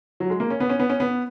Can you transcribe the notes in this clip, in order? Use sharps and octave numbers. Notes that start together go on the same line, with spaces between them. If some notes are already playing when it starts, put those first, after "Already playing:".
F#3
G#3
A#3
C#4
B3
C#4
B3
C#4
B3